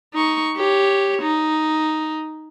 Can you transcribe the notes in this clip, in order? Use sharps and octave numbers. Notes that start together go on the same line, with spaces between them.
D#4 C#6
G4 C#5
D#4